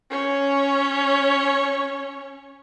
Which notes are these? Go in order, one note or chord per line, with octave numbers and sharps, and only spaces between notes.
C#4 C#5